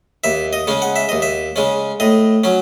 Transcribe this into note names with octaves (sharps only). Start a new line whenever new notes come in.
D#2 E5
D#5
C#3 G#3 C#4
F#5
E5
D#2 D#5
E5
C#3 G#3 C#4
A2 D#5
F#3 C#4